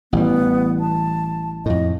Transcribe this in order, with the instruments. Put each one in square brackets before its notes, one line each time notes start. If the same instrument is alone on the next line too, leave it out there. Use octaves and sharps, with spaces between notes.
[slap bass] A1 E3 G3 [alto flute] B3
[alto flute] A5
[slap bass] F2 A2 [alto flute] D#5